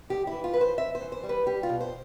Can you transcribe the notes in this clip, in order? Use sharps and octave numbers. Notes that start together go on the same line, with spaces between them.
F2 G4
E3 E4
F4
F2 B4
C5
C4 E5
C5
E3
C5
G3
B4
G3 G4
F4
B2
C5